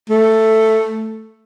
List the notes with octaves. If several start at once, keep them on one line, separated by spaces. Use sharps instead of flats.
A3